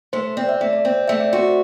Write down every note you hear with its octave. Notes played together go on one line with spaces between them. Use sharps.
A3 C5
C4 D5
E5
A3 D5
D5
C4
A3 E5
D5
F#4 C5